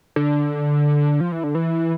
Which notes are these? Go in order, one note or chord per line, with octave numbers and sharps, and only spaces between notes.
D3
F3
E3
D3
E3